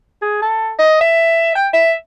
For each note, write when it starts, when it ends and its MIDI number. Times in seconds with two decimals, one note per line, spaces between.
0.22 0.41 68
0.42 0.73 69
0.79 0.98 75
1.01 1.54 76
1.55 1.68 79
1.73 1.94 76